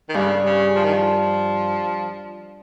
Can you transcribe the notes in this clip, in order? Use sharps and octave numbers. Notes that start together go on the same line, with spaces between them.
D#3
G2 C#3
C#3
F3
D#3
F3